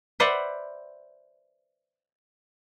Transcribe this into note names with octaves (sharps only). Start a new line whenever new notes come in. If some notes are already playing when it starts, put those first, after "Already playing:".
B4 C5 D5 E5 F#5